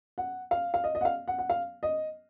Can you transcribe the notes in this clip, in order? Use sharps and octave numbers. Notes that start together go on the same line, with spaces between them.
F#5
F5
F5
D#5
D#5
F#5
F5
F#5
F#5
F5
D#5